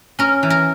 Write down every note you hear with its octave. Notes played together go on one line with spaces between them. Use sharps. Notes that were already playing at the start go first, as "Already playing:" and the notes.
C#4 A#4
E3
A#4